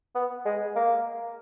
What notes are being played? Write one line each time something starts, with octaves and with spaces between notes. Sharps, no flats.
B3
G#3
A#3